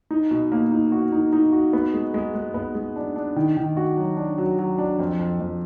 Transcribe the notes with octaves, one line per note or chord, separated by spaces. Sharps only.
D#4
B2
A#3
D#4
F#4
D#4
D#4
F#4
B3
G#3
G#3
G#3
B3
G#3
D4
D4
D#3
D#3
F#4
F#3
D4
F#3
F#3
D4
F2
F2
F2